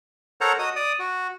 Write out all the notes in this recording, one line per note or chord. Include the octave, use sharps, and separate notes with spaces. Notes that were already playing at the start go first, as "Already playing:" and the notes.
A4 A#4 C5 C#5 F#5 A#5
F#4 D#5 D#6
D5 D#6
F#4